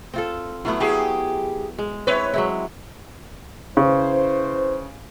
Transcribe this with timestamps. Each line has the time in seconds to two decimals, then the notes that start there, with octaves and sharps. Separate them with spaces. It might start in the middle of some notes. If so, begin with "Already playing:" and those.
0.14 C4 F4 A4
0.65 F#3 A3 B3 E4
0.80 F#3 E4 G4 G#4
1.78 G#3
2.07 C4 E4 B4 C#5
2.34 F#3 G#3 E4
3.77 C#3 E4 B4 C5